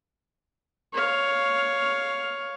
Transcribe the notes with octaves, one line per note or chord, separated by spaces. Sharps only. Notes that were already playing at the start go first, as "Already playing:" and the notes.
C#5 F5